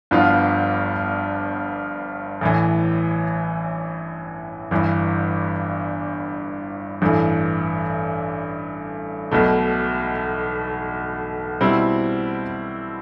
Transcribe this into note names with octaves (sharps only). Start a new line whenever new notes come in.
G1 G2 F3 B3 F4
A1 A2 E3
G1 G2 E3
A1 G2 E3 A3
B1 B2 A3
B2 G3 C4 E4